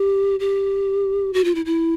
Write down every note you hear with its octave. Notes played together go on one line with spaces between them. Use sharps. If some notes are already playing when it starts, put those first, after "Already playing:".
Already playing: G4
G4
F#4
F4
E4
E4